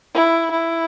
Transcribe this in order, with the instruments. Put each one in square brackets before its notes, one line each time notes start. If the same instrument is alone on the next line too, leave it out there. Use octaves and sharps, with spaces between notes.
[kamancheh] E4
E4